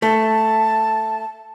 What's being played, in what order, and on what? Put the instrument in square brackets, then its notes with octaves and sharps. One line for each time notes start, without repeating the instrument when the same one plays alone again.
[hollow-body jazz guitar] A3 [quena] A5